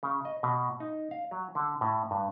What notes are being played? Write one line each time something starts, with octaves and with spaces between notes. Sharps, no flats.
C#3
D#5
B2
D#4
F5
F#3
D3
A2
G2